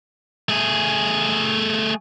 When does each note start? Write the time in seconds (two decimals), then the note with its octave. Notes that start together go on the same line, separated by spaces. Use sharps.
0.49 A3 G#4